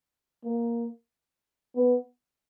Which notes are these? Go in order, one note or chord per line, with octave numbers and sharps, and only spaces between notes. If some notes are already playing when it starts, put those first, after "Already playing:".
A#3
B3